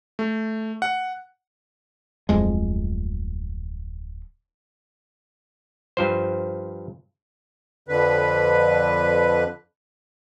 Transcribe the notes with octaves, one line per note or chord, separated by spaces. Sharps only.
A3
F#5
D1 F2 G#3
G2 F3 C5
F2 D3 B4